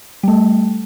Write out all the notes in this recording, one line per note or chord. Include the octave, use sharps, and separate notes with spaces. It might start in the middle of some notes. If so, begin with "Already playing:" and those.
G3 A3